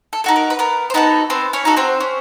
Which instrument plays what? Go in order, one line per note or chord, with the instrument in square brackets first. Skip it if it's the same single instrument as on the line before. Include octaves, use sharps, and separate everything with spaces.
[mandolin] A4
D#4 F#4 A4
A#4
B4
B3 A#4
C5
B3 D#4 F#4 A4 B4
B3 C4 C5
C#4 C#5
D#4 F#4 A4
C4 C5
C#4